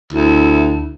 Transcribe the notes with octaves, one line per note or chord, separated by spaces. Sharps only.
D2 E4